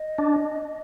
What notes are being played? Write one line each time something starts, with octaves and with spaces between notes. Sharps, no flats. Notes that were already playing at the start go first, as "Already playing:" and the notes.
Already playing: D#5
D4